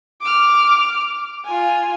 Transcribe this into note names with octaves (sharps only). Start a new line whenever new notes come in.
D6 F6
F4 G#5